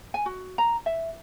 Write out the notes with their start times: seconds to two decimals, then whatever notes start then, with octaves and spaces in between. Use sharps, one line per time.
0.14 G#5
0.26 F#4
0.58 A#5
0.86 E5